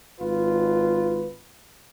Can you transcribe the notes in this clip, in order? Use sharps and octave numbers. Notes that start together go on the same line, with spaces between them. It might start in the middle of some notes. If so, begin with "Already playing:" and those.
G#1 F4 B4